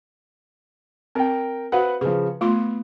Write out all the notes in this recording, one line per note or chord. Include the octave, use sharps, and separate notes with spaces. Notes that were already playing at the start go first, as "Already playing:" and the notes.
C4 A#4 G5
F#4 B4 C5 F5 F#5
C#3 F3 B4
A3 B3 F4 C6